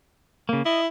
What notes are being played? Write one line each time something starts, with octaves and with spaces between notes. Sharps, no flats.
C#3 A#3
E4 D#5